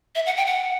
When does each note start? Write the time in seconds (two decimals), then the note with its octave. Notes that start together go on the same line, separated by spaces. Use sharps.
0.15 E5
0.26 F#5
0.37 G5
0.47 F#5